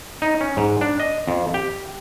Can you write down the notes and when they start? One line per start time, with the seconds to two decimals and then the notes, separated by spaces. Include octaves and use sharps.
0.22 D#4
0.41 C#4
0.57 G#2
0.81 D4
0.99 D#5
1.27 F2
1.54 G4